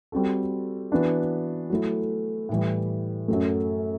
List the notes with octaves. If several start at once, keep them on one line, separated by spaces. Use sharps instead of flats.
G3 C4 F#4 A4
E3 B3 D4 F#4
F#3 A3 E4
A2 E3 G3
F#2 F#3 A3